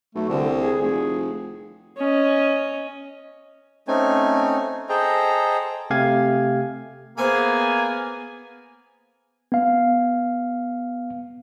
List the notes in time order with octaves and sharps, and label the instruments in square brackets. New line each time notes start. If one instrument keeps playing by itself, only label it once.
[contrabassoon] B1 [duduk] A3
[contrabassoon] C2 [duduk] D3
[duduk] G#4
[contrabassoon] F1 [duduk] G#4
[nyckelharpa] C#4 D#5
[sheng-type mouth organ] A3 C4 C#4 D#4 G#5
G#4 A4 C5 D#5 G5 A#5
[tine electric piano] C3 A3 G4 F5 G#5 G#6
[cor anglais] A#3 [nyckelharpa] B3 G#4 [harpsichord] C5 E5 B5 [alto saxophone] G#5
[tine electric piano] B3 F5